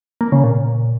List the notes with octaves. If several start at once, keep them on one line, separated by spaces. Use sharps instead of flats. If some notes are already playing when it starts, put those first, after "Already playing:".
A#3
C#3
A#2